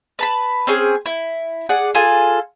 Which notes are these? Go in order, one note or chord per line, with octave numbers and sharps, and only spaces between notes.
B4 A5 B5
C4 C#4 G#4
E4
G#4 D5 F#5
F4 G#4 A4 G#5